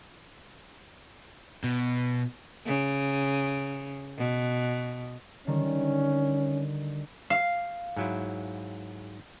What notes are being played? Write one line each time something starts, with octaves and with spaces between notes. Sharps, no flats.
B2
C#3
B2
D3 D#3 G3 C#4
F5
G#2 F#3 E4